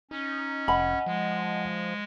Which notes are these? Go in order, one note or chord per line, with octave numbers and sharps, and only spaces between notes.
C#4 D#4
F1 D#5 F#5 G#5 B5
F3 G#3